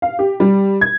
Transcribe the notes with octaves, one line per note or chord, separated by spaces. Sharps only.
F5
G4
G3
G#6